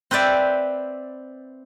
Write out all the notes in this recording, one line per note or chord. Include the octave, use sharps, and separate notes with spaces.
C4 B4 C5 D5 E5